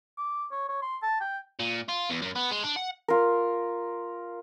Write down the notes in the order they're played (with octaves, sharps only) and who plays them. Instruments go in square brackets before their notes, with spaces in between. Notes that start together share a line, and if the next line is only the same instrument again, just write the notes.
[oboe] D6
C#5
C#5
C6
A5
G5
[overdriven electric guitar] A#2
F4
E2
F#2
B3
G#3
D4
F#5
[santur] F4 A#4